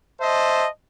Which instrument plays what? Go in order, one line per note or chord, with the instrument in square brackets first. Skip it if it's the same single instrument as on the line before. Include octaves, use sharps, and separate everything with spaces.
[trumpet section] C5 D#5 E5 A5